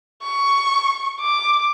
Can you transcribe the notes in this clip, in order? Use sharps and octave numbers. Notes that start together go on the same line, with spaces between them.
C#6
D6